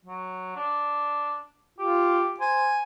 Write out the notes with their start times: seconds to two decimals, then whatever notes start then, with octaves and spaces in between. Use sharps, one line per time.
0.05 F#3
0.56 D4
1.79 F4 G4
2.40 C5 G#5